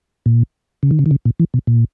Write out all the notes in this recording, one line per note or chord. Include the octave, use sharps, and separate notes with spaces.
A#2
C#3
D#3
C#3
D#3
C#3
A#2
E3
B2
A#2